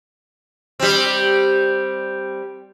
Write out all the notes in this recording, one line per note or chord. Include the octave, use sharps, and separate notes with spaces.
G3 C4